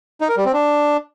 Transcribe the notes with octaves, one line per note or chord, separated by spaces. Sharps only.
D#4
A#4
G3
C4
D4